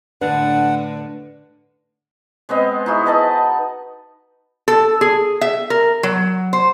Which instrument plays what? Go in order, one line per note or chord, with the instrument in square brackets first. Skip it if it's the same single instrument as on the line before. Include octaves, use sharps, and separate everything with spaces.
[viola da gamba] A2 D3 [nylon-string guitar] D4 [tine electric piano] B4 [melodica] F#5
[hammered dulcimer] G#3 B3 C4 D#5
D#4 E4 F#4 G#4
B4 D#5 A5 B5
[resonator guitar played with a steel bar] A4
G#4
E5
A#4
F#3
C5